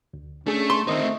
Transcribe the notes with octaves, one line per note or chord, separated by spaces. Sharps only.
D2
A3 C#4 D4 G#4
C6
D#3 C4 D#4 C5 D#5 E5
A3